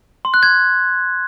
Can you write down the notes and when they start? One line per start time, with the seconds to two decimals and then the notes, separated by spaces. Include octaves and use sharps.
0.25 C6
0.34 F#6
0.43 G#6